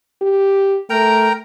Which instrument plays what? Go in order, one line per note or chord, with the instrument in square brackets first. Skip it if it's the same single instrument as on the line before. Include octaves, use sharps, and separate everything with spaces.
[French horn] G4
[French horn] A3 [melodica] A#4 G5 A#5